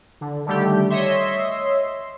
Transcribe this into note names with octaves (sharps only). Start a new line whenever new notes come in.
D3
D3 D#3 G3 A3 G4
C#5 D#5 E5 C6